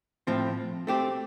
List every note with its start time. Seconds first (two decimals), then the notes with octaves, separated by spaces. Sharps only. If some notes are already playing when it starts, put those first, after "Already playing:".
0.27 A2 F3 C4
0.87 A3 C4 G4